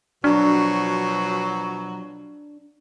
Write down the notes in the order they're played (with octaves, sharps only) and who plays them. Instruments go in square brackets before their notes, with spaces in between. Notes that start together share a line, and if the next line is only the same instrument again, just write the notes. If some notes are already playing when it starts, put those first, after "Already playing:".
[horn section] B2 F3 F#3 [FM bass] D4